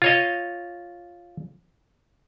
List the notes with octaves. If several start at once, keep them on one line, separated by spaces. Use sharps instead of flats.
F4 C#5 D#5